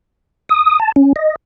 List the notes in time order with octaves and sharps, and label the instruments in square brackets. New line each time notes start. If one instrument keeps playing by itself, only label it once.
[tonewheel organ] D#6
A5
C#4
D#5